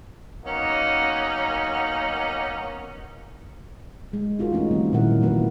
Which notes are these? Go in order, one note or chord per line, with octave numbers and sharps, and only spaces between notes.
F#3 A#3 B3 C#4 D#4
G#3
D#4 F4 F#4 G#4 A#4
E3 A3 C#4 D#4 F4
D#3 F#3 G3 C4 A#4
A#2 D#3 D#4 E4 A#4 F#5
E3 F#3 A#3 E4 B4